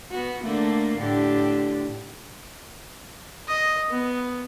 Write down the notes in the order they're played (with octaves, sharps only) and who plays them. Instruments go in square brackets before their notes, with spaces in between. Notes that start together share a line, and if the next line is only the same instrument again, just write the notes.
[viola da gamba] B3 F#4
D3 A3 A#3
A2 D3 G4
[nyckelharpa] D#5
B3